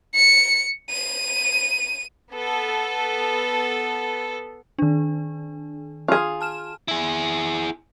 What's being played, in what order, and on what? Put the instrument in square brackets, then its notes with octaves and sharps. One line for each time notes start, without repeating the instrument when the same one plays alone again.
[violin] C#7
D#7
[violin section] B3 A4
[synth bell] D#3 D4
[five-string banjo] F4 G#4
[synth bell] A5 F6 E7
[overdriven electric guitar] E4 G#4